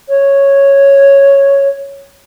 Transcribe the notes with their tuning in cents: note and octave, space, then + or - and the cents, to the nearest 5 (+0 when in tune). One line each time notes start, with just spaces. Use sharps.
C#5 -5